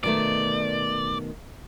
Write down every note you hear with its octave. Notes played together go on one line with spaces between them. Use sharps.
B2 D#3 A3 D5